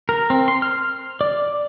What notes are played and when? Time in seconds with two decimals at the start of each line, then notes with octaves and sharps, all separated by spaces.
0.09 A#4
0.30 C4
0.48 C6
0.62 F6
1.21 D5